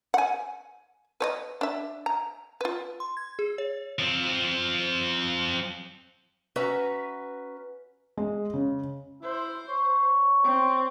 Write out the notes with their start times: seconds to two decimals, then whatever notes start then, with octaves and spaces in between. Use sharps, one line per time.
0.14 F#5 G#5
1.20 B4 C#5 D#5
1.61 D4 E5
2.06 A#5
2.61 F4 B4
3.00 C6
3.17 G#6
3.39 G#4
3.58 C#5
3.99 F3 C4
6.56 C#4 F#4 B4 E5 A#5
8.17 G#3
8.53 C#3
9.23 E4 C5
9.69 C#5
10.44 C4